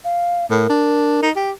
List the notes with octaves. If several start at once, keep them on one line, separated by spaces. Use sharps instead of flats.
F5
A2 A#4
D4
D#4
G4